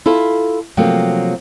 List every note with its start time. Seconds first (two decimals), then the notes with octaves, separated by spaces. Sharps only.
0.06 E4 F4 A4
0.77 C3 F3 F#3 A3 A#3